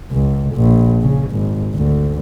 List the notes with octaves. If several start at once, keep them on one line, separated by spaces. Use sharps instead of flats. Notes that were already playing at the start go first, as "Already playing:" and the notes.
C#2
A#1
C#3
G#1
D2